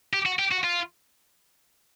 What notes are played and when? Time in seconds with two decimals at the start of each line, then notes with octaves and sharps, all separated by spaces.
0.13 G4
0.26 F#4
0.39 G4
0.51 F#4
0.64 F4